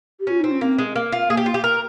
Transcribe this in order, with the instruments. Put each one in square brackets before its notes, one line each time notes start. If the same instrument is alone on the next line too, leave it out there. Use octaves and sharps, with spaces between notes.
[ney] G4
[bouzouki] C#4 [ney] F4
[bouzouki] C4 [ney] D#4
[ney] C#4
[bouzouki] A#3 [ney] C4
[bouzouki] G#3
A#3
F4
[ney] A#3 [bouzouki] G#4
[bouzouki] G4
F4
G4
A#4